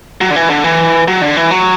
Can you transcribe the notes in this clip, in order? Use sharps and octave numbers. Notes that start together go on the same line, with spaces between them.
F#3
D3
E3
D3
E3
F#3
D3
E3
F#3